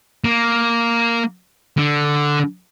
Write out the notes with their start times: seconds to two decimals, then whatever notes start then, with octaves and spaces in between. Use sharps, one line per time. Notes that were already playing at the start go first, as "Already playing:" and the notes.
0.24 A#3
1.77 D3